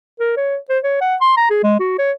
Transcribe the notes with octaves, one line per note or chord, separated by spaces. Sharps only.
A#4
C#5
C5
C#5
F#5
C6
A#5
G#4
G#3
F#4
C#5